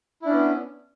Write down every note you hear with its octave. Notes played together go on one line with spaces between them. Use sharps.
B3 C#4 D4 E4